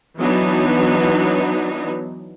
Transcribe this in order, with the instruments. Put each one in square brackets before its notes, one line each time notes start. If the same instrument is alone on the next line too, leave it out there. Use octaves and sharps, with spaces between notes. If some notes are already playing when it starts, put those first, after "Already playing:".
[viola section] E3 F#3 B3 D4 D#4